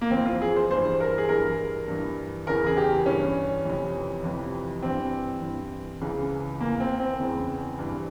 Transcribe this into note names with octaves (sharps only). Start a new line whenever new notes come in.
A#3
F2 E3 C4
F4
G#4
C5
G2 E3 C5
A#4
G#4
G2 E3 A#4
G2 E3
E2 C#3 E3 A#4
G#4
G4
G2 E3 C#4
F2 C3 E3
F2 C3 E3
G2 E3 C4
G2 E3
C#2 C#3 E3
E2 E3 A#3
C4
C4
E2 C#3 E3
G2 E3